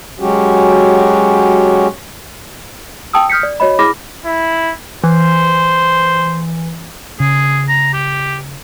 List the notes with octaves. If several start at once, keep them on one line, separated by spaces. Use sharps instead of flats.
F#3 G#3 C#4 F#4 G4
G5 A5 D#6 E6
D#6 F6 G6 B6 C#7
D5
F#4 C#5 D#5 B5
E4 G#4 B5 D6 F6 A#6
E4
E3 C5
C#3 G#4
A#5
G4